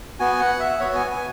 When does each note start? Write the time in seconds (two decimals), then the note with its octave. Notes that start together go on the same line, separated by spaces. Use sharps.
0.20 B3 F#4 G#5
0.40 F#5
0.60 E5
0.80 B3 F#4 C#5
0.95 G#5
1.11 G#5